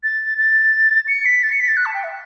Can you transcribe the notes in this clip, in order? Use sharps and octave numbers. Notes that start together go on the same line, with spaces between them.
A6
A6
C#7
B6
A6
C#7
B6
A6
F#6
A5
G5
E5